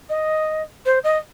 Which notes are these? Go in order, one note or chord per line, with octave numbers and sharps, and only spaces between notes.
D#5
C5
D#5